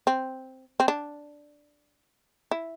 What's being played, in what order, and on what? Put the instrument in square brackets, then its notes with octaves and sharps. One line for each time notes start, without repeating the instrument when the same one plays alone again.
[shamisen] C4
C4
D4
E4